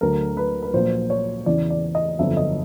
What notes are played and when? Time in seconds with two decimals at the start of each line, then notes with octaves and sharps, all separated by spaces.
0.01 D2 D3 F#3 A#4
0.37 B4
0.62 B4
0.73 A#1 A#2 F#3 C5
1.10 C#5
1.46 E2 C#3 E3 D5
1.70 D5
1.95 D#5
2.19 G1 F2 D3 F#3 E5
2.37 D#5